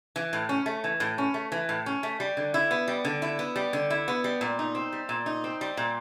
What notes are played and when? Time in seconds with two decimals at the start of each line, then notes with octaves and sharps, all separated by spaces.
0.16 E3
0.33 A2
0.49 C#4
0.66 A3
0.84 E3
1.00 A2
1.18 C#4
1.34 A3
1.52 E3
1.69 A2
1.86 C#4
2.03 A3
2.20 G3
2.37 D3
2.54 E4
2.71 B3
2.88 G3
3.05 D3
3.22 E4
3.39 B3
3.56 G3
3.73 D3
3.90 E4
4.08 B3
4.24 G3
4.41 A#2
4.59 D#4
4.75 C4
4.93 G3
5.09 A#2
5.26 D#4
5.44 C4
5.61 G3
5.77 A#2